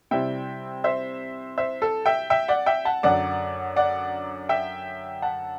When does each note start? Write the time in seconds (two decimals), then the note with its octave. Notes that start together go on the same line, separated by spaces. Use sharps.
0.11 C3 G3 C4 E4 E5 G5
0.84 C5 E5
1.58 C5 E5
1.82 A4
2.06 E5 G5
2.30 E5 G5
2.48 D5 F#5
2.66 E5 G5
2.85 F#5 A5
3.03 F#2 D3 F#3 D5 F#5
3.76 D5 F#5
4.49 E5 G5
5.22 F#5 A5